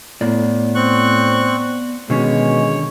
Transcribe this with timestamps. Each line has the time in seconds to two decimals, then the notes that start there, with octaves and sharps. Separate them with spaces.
0.21 A2 B3 D5
0.75 C4 C#6 F#6
2.10 B2 D3 D#3 G#3 C#4 C#5